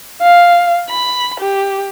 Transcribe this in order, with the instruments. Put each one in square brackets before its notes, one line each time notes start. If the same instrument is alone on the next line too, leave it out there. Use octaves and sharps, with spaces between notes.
[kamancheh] F5
B5
G4